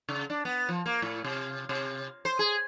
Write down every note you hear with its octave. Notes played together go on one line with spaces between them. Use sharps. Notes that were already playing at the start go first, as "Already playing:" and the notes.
C#3
D4
B3
F3
A#3
A2
C3
C3
C5
G#4